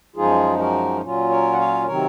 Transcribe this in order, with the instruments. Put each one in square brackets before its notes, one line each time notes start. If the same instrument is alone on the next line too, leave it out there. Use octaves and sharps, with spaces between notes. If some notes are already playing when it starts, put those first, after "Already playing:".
[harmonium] F#2 F3 G#3 D#4 F4 G#4
F#4 A#4
A#2 F#3 C#4 F4
A#4 C#5
F#5
C#5 F5
C3 D#3 F#3 C4 A#4 C#5